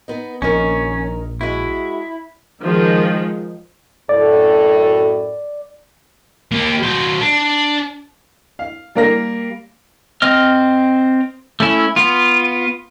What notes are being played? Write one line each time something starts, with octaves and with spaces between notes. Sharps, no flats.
B3 D#4
A#1 D#3 C#4 D#4 A#4
G#3 E4 F#4
D#3 F3 G#3
F#2 A2 A4 D5
A#3 G4
F#3 C5
D4
F5
G3 A#3 A#4 F5 A#6
C4 D#5 F6
A3 C#4 E4
B3 F4